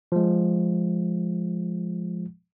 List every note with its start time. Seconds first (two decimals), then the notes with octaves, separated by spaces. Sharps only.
0.12 F3 G#3